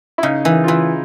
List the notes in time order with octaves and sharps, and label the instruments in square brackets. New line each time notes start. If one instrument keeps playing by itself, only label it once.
[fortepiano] E4
[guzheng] C#3 [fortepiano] D#4
[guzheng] E3
[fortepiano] F4
[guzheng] E3 [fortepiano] E4